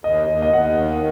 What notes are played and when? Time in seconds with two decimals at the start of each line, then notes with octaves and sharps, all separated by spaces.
0.04 D#2 D#5
0.29 D#2
0.42 D#5
0.53 D#2 F#5
0.77 D#3